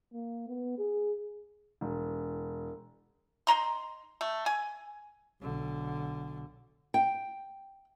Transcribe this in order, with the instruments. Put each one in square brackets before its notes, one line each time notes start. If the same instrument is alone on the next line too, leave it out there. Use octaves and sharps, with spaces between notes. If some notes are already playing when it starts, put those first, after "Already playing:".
[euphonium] A#3
B3
G#4
[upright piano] E1
[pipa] D#4 C5 A#5 C6
A3
G#5
[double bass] B1 D3
[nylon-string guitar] G5